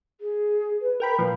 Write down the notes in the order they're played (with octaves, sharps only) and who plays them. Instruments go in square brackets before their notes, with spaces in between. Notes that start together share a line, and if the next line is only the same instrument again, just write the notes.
[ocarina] G#4
B4
[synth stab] A#4 G5 B5
[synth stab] A#2 F3 [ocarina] B4